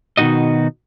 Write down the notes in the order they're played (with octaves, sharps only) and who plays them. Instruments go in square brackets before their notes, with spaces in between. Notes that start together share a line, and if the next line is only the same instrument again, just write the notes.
[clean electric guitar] B2 D#3 G3 D#4 F#4 D#5